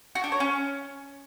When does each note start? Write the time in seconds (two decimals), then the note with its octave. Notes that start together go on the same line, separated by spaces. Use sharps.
0.15 F#4
0.24 D4
0.32 C#5
0.40 C#4